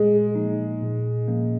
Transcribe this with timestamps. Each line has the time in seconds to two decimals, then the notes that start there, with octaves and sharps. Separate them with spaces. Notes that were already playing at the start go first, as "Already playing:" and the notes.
Already playing: A#2 G#3
0.35 F3 A#3 D#4
0.82 A#2
1.28 F3 A#3 C#4